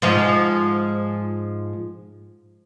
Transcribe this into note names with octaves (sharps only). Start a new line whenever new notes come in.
G#2 F3 G#3